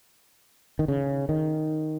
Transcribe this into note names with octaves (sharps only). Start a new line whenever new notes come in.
D#3
C#3
D#3